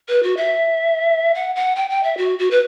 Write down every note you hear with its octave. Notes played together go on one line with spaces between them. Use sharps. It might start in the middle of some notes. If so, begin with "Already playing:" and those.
B4
F#4
E5
F#5
F#5
G5
G5
E5
F#4
F#4
B4